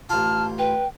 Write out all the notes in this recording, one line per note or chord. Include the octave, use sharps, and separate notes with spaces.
A1 F4 A5 F6
B4 G5